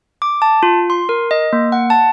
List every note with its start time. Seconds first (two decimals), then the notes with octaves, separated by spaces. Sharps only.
0.22 D6
0.42 A5
0.63 F4
0.90 C6
1.09 A#4
1.31 D#5
1.53 A#3
1.72 F#5
1.90 A5